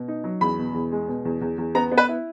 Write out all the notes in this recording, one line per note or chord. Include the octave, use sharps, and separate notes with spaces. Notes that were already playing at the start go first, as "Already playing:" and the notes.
Already playing: B2
D#4
F#3
E2 B5
B2
E2
G#3
B2
E2
E2
E2
B3 A#5
B3
B4
E4